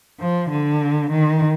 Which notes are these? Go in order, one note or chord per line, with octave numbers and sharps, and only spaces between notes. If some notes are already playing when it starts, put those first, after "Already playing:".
F3
D3
D#3